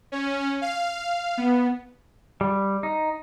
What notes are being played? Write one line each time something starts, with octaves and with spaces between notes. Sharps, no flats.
C#4
F5
B3
G3
D#4